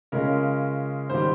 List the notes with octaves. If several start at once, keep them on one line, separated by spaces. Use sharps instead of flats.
C#3 G#3 C#4 F4 A#4
G#2 D#3 G3 C5